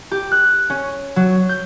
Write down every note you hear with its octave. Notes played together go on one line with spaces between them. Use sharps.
G4
F#6
C#4
F#3
G6